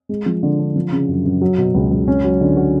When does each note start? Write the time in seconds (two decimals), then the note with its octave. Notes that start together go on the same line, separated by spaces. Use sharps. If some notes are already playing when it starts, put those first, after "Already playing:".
0.09 G#3
0.26 F3
0.43 D3
0.59 D4
0.76 F3
0.92 C#3
1.09 F#2
1.25 F#2
1.41 F#3
1.58 B2
1.74 C#2
1.91 C#2
2.08 C#4
2.24 F#3
2.41 D3
2.57 F#4